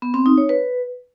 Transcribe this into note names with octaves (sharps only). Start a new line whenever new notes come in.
B3
C4
D#4
C#5
B4